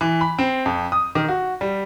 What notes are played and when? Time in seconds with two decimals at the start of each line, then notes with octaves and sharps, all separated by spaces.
0.01 E3
0.21 B5
0.38 C4
0.66 F2
0.92 D#6
1.15 D#3
1.29 F#4
1.61 G3